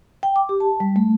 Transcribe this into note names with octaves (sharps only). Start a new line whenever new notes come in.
G5
D6
G4
A5
G3
A3